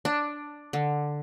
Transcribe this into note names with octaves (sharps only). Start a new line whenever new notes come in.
D4
D3